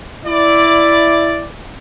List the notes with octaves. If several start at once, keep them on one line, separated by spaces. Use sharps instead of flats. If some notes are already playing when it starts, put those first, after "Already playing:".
E4 D5